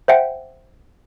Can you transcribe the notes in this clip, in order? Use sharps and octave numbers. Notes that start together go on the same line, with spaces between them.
C5 E5 F#5 G5